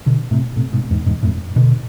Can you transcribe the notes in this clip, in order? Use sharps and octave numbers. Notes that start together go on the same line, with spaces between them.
B2 D3
A2 C3
A2 C3
G#2 B2
E2 G#2
E2 G#2
F2 A2
B2 D3